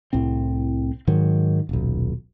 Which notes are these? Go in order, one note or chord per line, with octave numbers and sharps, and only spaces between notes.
C2 A2 C4
G#2 D#3 F#3
D#1 B1